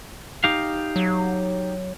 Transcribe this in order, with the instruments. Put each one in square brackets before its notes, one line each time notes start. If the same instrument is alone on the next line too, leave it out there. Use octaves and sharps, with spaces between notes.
[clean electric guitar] D#4 G4 F5
[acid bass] F#3